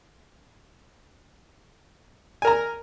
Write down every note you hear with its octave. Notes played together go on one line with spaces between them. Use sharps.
A#4 G#5 A#5